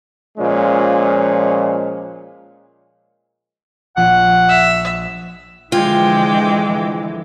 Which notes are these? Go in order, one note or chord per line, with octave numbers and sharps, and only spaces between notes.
A#2 F3 G#3 C#4
A#1 F#5 F#6
E5
D3 E3 F3 G#3 F4 G5 D6